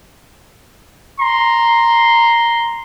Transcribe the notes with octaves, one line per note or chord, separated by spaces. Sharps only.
A#5 C6